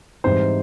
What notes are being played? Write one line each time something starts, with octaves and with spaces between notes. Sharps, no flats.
G#2 E3 G3 C4 D#4 C5